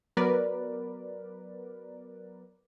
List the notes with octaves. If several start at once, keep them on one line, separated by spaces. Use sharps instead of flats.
F#3 B3 A#4 B4 D5